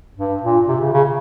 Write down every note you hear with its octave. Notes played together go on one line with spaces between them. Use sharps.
G2
A#2
C3
C#3
C#3